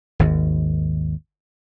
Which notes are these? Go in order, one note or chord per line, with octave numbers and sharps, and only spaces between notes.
G#1 D#2